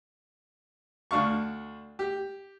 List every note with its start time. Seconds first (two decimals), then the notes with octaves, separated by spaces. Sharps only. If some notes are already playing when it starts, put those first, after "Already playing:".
1.11 D2 D4 F5 C#6
1.99 G4